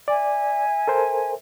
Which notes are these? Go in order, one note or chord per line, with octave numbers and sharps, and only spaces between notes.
D5 E5 G#5
A4 A#4 C5